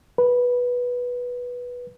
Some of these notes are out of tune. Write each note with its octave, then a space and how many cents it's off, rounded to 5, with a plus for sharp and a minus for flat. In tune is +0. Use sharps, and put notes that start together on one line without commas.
B4 -10